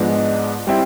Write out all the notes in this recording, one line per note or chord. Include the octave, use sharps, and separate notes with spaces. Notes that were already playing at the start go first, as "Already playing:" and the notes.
Already playing: G#2 F3 G#3 B3 D4
G3 C4 E4